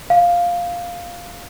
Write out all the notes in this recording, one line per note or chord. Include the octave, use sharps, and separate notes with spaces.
F5